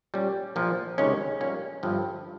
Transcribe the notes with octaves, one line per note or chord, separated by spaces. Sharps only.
A#2 G3 C#4
A#1 A#2 F3
C#2 C3 D#3 G#3 C#4
A#1 A#2 G3 A#3 C#4
G1 G2 F3